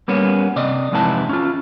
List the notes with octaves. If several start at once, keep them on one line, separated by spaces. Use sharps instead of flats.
G3 A#3 B3 C#4
C3 D5 D#5
F2 G#2 C3 E3 E4 A5
C#4 F4